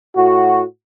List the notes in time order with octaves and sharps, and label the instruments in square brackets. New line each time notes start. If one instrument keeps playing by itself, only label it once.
[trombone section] A2 F#4